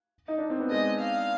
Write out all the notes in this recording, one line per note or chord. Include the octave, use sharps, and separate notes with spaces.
D#4
D4
C4
B3
G#3 D#5
F5